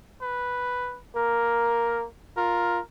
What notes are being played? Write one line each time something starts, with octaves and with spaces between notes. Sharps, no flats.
B4
A#3 A#4
F4 A#4